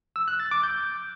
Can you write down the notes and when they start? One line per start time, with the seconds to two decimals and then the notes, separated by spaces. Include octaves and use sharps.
0.16 E6
0.28 F#6
0.40 A6
0.51 D6
0.63 G6